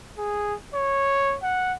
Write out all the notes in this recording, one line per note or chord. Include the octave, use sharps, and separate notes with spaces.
G#4
C#5
F#5